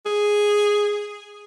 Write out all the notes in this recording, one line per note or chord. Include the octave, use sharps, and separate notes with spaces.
G#4